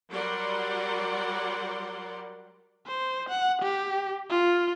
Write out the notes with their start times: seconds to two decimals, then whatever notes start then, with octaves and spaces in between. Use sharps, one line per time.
0.11 F#3 G3 A#4 D5 F#5 C6
2.87 C5
3.29 F#5
3.62 G4
4.30 F4